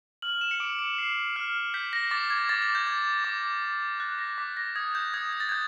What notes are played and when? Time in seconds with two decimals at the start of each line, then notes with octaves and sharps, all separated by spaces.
0.22 F6 F#7
0.41 E7
0.51 C#7
0.60 D6 D7
0.79 C#7
0.98 D6 C7
1.36 F6
1.74 G6 B6
1.93 A#6
2.11 D6 A6
2.30 G#6
2.49 D6 A6
2.62 G#6
2.75 G6
2.87 D6 G#6
3.24 D6
3.62 D6
4.00 F#6 A6
4.19 A#6
4.38 D6 B6
4.57 A#6
4.76 D#6 G#6
4.95 G6
5.14 D#6 G#6
5.33 G#6
5.40 A6
5.49 G6 G#6